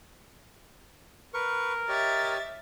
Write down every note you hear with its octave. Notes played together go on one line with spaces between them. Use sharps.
A#4 B4 C#6
G4 C#5 D#5 E5 A6